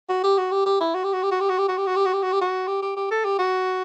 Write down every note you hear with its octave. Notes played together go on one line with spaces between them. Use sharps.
F#4
G4
F#4
G4
G4
E4
F#4
G4
F#4
G4
F#4
G4
F#4
G4
F#4
G4
F#4
G4
F#4
G4
F#4
G4
F#4
G4
G4
G4
A4
G4
F#4